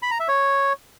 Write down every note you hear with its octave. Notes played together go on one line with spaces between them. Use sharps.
B5
A#5
E5
C#5